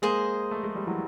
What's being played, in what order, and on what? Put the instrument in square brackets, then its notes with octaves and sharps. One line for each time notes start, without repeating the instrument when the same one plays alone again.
[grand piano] G#3 A#3 [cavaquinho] G#4 C5 D#5
[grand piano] A3
G#3
G3
E3 F#3